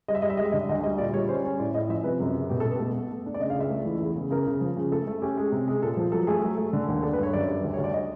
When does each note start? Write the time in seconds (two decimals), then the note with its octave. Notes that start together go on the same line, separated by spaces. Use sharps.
0.08 G3 D#5
0.15 E5
0.22 G3 D#5
0.30 E5
0.37 G#3 D#5
0.45 E5
0.51 D3 D#5
0.69 D2 D#5
0.84 G3 D#5
0.98 A#2 D5
1.13 G3 C#5
1.29 C#4 C5
1.44 C#4 C#5
1.59 A2 D5
1.74 A2 D#5
1.89 F3 E5
2.04 C3 B4
2.20 F#2
2.34 C#3
2.49 B2 G4
2.60 A4
2.65 B2
2.71 B4
2.80 A3
2.95 A3
3.11 A3
3.26 D4
3.34 D5
3.40 C#3 D#5
3.50 F5
3.56 C#2 E5
3.70 A3
3.85 E3
4.02 E2
4.16 C#3
4.31 C#3 A#4
4.47 C#3
4.61 F3
4.77 C#3
4.92 A3 A4
5.07 A3
5.22 C#4 G4
5.38 G#3
5.52 C3
5.68 G#3
5.82 A#2 A4
5.97 F3
6.12 F#3 A4
6.27 A3 G#4
6.43 F#3
6.58 A3
6.73 D3
6.88 D#2
7.03 D4 A4
7.13 B4
7.19 G2 C#5
7.33 F#2 D5
7.48 G3
7.64 D2
7.74 C#5
7.78 D2
7.84 D5
7.94 D#5